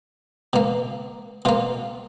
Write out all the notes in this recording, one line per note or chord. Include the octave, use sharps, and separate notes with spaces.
B2 A#3
B2 A#3 F4